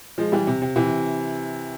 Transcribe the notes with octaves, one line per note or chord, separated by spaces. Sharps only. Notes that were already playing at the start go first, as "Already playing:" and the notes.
F3 G#3
E3 G3
C3
C3
C3 E3